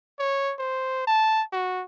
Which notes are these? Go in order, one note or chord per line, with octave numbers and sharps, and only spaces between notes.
C#5
C5
A5
F#4